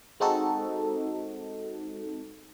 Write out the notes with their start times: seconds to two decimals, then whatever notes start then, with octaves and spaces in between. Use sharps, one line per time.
0.20 G#3 C4 D#4 F#4 A4